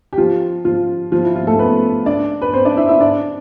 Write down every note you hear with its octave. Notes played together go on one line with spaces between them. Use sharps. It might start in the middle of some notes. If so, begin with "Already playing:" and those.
G4
F3 F4
F3 F4
F3 F4
E4
F3 F4
A3 A4
B3 B4
D4 D5
B4
C4 C5
D4 D5
E4 E5
E4 E5
D4 D5